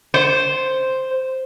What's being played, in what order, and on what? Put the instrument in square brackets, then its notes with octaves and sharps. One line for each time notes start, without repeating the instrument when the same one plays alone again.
[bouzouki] C5